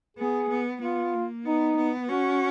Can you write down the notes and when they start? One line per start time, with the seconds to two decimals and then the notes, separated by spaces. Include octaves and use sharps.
0.17 B3 G#4
0.49 B3
0.81 B3 F4
1.14 A#3
1.45 B3 D#4
1.77 B3
2.09 C#4 F#4